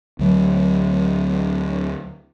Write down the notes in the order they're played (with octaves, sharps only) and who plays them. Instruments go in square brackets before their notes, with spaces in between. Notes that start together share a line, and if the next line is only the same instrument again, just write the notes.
[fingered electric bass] D2 F#3